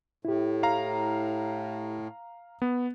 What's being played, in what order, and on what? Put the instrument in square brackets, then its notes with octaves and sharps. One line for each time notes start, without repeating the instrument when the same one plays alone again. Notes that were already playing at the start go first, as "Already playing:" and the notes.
[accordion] A2 [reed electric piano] E4 G4
[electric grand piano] F5 A#5
B3